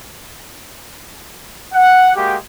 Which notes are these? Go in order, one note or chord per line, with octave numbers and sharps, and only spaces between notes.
F#5
G#3 A#3 F#4 G4